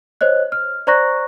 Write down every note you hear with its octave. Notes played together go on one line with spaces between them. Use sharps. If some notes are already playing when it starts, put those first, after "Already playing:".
C5 C#5 D#5 F#6
F6
C5 D5 A#5 C#6 F#6 A#6